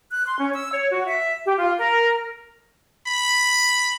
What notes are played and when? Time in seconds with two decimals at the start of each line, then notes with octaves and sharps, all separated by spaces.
0.11 F#6
0.26 C6
0.39 C#4
0.55 E6
0.73 C#5
0.91 F#4
1.07 E5
1.45 G4
1.58 F4
1.78 A#4
3.07 B5